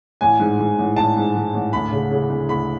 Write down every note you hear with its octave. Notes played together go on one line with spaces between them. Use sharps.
A1 G#5
G#2
G#2
A1
A1 A5
G#2
G#2
A1
D2 B5
C#3
C#3
D2
D2 B5